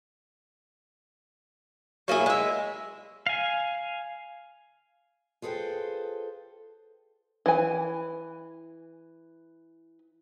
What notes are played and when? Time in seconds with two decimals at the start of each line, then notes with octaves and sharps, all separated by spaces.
2.08 F#3 A#3 E4 G#4
2.26 G#3 E5
3.27 F5 G#5
5.42 F4 G#4 A4 B4 C5 G5
7.46 E3 G#5